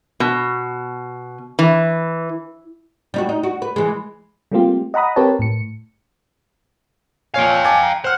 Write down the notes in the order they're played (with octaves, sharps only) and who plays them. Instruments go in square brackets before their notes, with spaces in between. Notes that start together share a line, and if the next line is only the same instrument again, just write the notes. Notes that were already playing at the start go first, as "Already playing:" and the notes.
[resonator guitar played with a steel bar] B2
E3
[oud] G3 D#4 F#4
D#4
F#4
B4
E3 G#3
[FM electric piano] G3 A3 A#3 C4 F4 G4
D#5 F#5 A#5 B5 D#6
C4 G4 A#4 B4 C#5 A5
A2 C#7
[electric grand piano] A#2 C#5 G#5 [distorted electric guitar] F5 G5
[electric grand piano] G#5 A5 D6
A#5
[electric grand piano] C5 F6 [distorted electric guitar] F#5